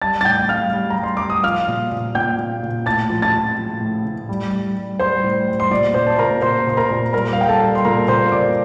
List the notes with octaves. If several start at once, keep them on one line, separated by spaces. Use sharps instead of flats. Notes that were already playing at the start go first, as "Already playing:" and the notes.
G3 A5 A6
A6
A2 G5 G6
G3 F5 F6
G3
A#5
G3
C6
G3 D6
D#6
F3 F5 F6
A#2
A#2
A#2 G5 G6
A#2
A#2
A2 A5 A6
F3
A5 A6
F3
F3
A2
A2
G3
G3
G3
G3 C5 C6
A2
G3
C6
A#2 D5 D6
A#2 C5 C6
A5
A#2 A#4 A#5
A#2 C5 C6
A#2 C6
A#4 A#5
A#2
G3 A#4 A#5
F5
G3 G5
A4 A5
G3
C6
A#2 A#4 A#5
A#2 C5 C6
A#2 D5 D6